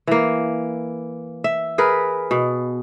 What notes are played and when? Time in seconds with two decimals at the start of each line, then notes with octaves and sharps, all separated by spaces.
0.07 E3 A#3
1.44 E5
1.78 G#4 A#4 B4
2.31 B2